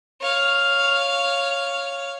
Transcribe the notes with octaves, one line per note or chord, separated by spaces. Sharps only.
C#5 F5